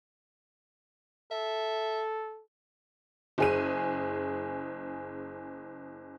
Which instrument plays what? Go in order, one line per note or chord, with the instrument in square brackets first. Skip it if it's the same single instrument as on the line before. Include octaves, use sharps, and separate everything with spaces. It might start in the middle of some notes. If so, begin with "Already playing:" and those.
[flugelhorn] A4 [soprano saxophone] E5
[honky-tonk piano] F#1 G#4 D#7